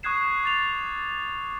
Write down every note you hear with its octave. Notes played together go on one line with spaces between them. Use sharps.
C#6 D#6 F#6 G#6 C7 E7
D6 A6 F7